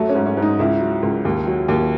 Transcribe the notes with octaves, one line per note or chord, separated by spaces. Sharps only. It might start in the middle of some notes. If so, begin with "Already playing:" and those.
Already playing: F#2 F#3 A3
C#4
G#2
C#4
G#2
D#4
C#2 E4
F#3
C#2
D#2
F#3
D#2